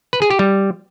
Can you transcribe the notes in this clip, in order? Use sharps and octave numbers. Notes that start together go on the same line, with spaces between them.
B4
G#4
G4
G3